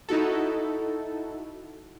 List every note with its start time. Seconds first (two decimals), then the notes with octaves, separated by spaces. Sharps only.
0.09 D#4 E4 F#4 A4